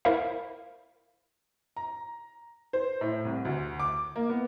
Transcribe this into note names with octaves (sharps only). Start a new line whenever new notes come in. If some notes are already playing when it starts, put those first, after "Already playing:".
E4 A#4 C5 E5 F5
A#5
C5
A2
C2
D2
D6
A#3
B3